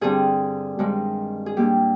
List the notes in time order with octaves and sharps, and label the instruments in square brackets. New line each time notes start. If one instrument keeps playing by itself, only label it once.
[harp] G2 D3 G3 C4 G#4
G2 D#3 G#3 C4
G#4
A#2 G3 A#3 D4 G4